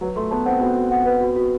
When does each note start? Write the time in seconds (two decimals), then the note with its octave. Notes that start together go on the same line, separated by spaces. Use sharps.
0.01 F#3 B4
0.16 A3 C6
0.31 B3 A5
0.46 C4 F#5
0.61 B3 F#4
0.76 F#4
0.91 F#5
1.06 B4
1.21 F#4
1.36 F#4